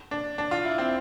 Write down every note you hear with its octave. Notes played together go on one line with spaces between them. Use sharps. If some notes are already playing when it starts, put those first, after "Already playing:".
D4
D4
F4
E4
C4